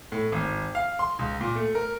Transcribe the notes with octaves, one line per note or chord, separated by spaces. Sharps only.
A2
G#1
F5
C6
C#2
A#2
A3
A#4